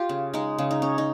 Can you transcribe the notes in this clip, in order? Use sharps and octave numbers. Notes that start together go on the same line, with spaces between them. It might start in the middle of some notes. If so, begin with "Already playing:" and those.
Already playing: F4 G4
C#3
G#3 D#4
C#3
D#4
C#4
D#4